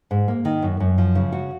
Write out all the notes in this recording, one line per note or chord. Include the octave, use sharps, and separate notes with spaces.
G#2
A#3
D#3
F#2
F#2
F3
C#3
F#4